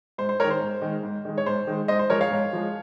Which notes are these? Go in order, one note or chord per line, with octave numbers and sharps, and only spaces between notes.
G#2 C5
C5
D#3 G#3 A#4 C#5
C5
G#2
D#3 G#3
G#2
D#3 G#3
C#5
G#2 C5
D#3 G#3
G#2 C5 D#5
C5
F3 G#3 A#4 C#5
C#5 F5
G#2
F3 G#3